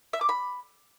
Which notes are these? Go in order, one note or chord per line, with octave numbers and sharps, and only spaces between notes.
E5
D6
B5